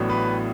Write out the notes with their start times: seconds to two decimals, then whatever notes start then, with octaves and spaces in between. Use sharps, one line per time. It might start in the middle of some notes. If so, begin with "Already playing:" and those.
Already playing: A1 A2 F#3 B3 D4
0.10 B4